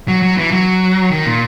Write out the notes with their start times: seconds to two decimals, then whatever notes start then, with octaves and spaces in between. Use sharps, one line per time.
0.08 F#3
0.22 F#3
0.37 E3
0.51 F#3
1.11 D#3
1.26 A#2